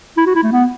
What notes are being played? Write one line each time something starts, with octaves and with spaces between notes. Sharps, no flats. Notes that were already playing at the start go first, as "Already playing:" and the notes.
E4
F#4
E4
A3
B3